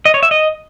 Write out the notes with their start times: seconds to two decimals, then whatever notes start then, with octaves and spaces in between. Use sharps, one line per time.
0.06 D#5
0.14 C#5
0.23 E5
0.31 D#5